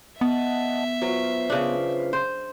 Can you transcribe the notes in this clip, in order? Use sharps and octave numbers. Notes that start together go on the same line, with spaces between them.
B3 D#5 E5 F#5 A5
F#3 F4 B4 C5
C#3 D4
C5